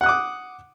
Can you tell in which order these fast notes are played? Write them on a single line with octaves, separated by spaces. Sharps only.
F#5 F#6 D#6 D6